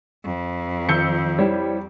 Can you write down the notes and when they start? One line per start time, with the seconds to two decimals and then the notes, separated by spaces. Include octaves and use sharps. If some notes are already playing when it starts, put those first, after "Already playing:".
0.24 F2
0.89 D#3 F3 E6 G6 C#7
1.39 G3 E4 C5 C#5